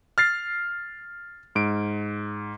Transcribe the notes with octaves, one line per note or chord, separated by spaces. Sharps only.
F6 A6 C7
G#2 D7